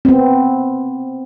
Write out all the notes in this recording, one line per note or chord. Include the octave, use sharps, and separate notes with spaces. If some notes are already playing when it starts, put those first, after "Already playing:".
B3 C4